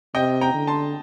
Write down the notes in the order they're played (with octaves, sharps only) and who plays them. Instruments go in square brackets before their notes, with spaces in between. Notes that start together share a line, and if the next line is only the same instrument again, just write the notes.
[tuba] C3 [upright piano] D#5 G5
[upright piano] G5 A#5
[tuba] D3
[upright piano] A5 C6